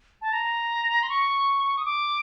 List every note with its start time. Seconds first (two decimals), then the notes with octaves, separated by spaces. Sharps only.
0.22 A5
0.33 A#5
1.03 C6
1.09 C#6
1.78 D#6
1.85 D6